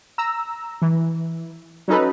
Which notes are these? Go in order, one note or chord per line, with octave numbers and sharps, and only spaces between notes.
A#5 E6
E3
F#3 C#4 D#4 A4 B4